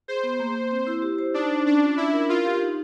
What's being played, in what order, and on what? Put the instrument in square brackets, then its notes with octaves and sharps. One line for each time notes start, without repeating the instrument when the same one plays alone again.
[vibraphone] G#4 [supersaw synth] C5
[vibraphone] B3
A#3
A#3
C4
E4
G4
C5
[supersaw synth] D4 [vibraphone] D#4
[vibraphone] D#4
[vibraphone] C#4 [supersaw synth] D4
[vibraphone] F4
[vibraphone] D4 [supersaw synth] E4
[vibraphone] A#4
[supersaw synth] F4 [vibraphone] A#4
[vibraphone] G4
D#4